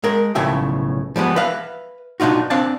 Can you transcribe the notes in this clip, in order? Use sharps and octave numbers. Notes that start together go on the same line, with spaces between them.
G#3 A#4
B1 A2 C#3 F3 E5 G5
F3 G3 G#3 B3
B4 E5 F5
B2 D4 D#4 F4 F#4
C4 D4 F5 A5